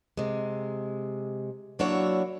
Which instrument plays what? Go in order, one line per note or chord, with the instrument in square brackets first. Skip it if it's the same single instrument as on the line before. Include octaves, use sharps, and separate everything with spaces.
[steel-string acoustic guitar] C3 G#3
F#3 A#3 D4 E4 F#4 C#5